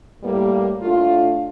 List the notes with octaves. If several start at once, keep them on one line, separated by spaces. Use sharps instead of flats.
A2 G3 A#3
A2 A3 D4 F4